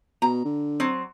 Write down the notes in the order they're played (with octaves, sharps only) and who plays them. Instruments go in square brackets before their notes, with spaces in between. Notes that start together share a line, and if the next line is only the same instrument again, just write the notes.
[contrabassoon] B2 [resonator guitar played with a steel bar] A#5
[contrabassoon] D3
[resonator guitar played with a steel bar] F#3 C4